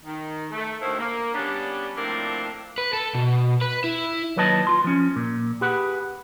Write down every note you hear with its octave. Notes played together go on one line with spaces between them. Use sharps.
D#3
A3
D2 A2 D#3 E4 C5 F5
A#3
G3 B3 C#4 D4
A2 F3 A#3 C4 D4 A#4
B4
A4
B2
B4
E4
D#2 F#3 B4 C#5 D#5 A5
F4 C6
F3 C#4
A#2
G4 G#4 B4 F#5